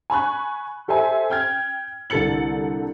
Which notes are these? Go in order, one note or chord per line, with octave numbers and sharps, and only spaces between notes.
G#5 B5 C#6 F#6
G4 A4 C5 E5 G#5
G5 F6 G#6
C2 D3 A4 A6 C#7 F#7